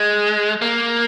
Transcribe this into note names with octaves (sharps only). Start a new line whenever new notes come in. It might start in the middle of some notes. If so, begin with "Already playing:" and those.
Already playing: G#3
A#3